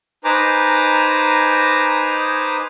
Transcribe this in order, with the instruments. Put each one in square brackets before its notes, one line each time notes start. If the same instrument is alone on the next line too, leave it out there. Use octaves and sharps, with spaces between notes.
[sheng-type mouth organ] D#4 B4 C5 G#5 A#5 D6